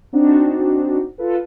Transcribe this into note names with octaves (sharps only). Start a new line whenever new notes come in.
C4 D4 D#4 F#4
F4 A4 B4